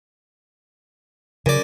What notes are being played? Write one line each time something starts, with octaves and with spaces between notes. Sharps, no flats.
F#2 C#3 D5